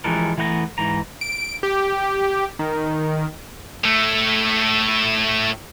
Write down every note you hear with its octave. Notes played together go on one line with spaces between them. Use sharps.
E3 F3 G3 G#3 A4 A#4
E3 A3 B3 F#5 A#5
G#2 E3 A#5
D7
G4
D#3
A2 A3